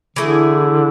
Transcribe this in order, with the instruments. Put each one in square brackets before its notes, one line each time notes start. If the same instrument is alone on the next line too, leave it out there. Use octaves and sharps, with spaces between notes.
[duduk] D3 [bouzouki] E3 A3 E4 G#4